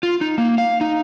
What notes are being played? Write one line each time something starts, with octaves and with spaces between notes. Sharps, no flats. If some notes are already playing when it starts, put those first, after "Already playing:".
F4
D#4
A#3
F5
D#4